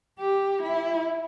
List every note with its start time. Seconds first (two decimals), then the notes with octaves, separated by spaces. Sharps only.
0.19 G4
0.62 E4